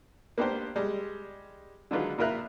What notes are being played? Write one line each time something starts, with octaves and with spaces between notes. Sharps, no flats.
A#3 B3 D4 G4 C5
G3 G#3
D3 D#3 F#3 G#3 F4 B4
A#1 E4 F4 A#4 E5 F#6